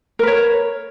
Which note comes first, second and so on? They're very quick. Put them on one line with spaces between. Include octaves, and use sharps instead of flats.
A#4 B4 C#5